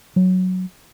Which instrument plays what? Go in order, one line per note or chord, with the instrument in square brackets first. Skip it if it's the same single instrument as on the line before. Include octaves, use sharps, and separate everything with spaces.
[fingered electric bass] F#3